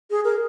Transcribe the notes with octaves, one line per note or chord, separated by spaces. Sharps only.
G#4
A#4